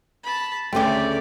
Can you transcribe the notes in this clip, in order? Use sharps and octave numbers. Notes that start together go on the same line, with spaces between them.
A5 B5
D2 C#3 A3 C4 G4 C#5 D5